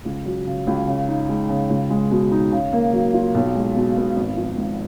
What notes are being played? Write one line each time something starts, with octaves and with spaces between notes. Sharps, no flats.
C#2
F#3
C#3
C#2
C#3
D#4
G#3
C#3
C#2
G#3
B2
D#4
C#3
A#3
F#3
F4
B1
G#3
B2
B3
G#1
F3
G#2